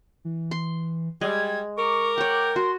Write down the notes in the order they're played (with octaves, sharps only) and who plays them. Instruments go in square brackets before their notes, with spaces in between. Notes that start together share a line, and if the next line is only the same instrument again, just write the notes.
[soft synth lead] E3
[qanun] C6
[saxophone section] G3 [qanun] G#3 [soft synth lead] G#6
[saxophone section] A#4 [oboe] C#6 [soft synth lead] D6
[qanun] C#5 F#5 [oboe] G5
[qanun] F#4 [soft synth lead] C6